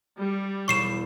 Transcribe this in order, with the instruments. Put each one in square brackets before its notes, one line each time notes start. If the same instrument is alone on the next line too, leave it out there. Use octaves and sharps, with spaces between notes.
[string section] G3
[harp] E1 [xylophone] C#6 C7 E7